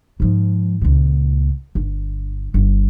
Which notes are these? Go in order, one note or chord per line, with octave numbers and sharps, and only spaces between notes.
G#2 F3
C#2 A#2
G1
G1